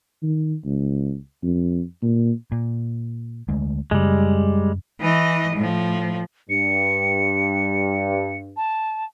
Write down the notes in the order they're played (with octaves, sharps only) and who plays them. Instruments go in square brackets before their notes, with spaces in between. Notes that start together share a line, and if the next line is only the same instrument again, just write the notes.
[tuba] D#3
C#2
F2
A#2
[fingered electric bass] A#2
D2 G#3
[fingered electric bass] F#2 C#3 [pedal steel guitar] G3 G#3
[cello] E3 D#5
A2 F3
[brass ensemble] G2 [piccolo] C#7
[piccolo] A5